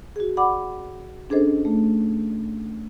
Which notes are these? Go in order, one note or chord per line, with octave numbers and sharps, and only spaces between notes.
F#4 G#4
D5 F#5 B5 D6
C#4 D4 G#4 A4 C5 D#5
A3